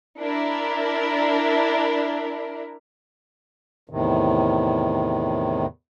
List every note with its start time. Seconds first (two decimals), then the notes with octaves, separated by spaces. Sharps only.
0.20 D4 E4 A#4
3.90 E2 A2 C3 D#3